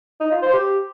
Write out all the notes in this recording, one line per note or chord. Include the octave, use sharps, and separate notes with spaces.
D#4
F4
C5
G4